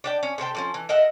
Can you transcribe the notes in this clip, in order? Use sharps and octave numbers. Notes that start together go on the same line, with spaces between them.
D4 D5 G5
C#4
C3 A4 C5 G5
D3 F3 C#4
E3
A#4 D#5 E5 F#5